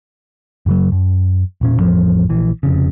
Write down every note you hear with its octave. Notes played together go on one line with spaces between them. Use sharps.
F#2 C#3 F#3
F#2
E1 A#2 C#4
A1 F2 F3
A#1 E3
F1 F2 C#3